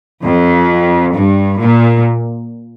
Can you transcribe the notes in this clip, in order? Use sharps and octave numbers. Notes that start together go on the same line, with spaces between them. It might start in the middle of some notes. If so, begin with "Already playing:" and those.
F2
G2
A#2